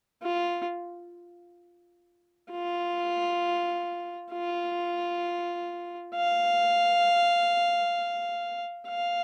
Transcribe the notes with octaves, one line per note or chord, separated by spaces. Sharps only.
F4
F4
F4
F5
F5